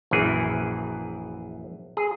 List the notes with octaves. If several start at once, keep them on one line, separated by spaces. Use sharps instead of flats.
A#1 F#2 E3 G#4
G#4